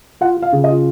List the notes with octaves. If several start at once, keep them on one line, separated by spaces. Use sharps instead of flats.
F4 F#5
F4
F5
C#3
D#5
F4